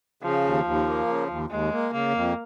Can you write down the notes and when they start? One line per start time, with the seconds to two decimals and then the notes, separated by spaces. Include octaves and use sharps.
0.23 C#3 F3
0.44 D#2
0.65 D#2
0.87 A#3
1.08 C#3
1.29 D#2
1.50 D#2 G#3
1.71 A#3
1.93 C#3 A#3
2.14 F2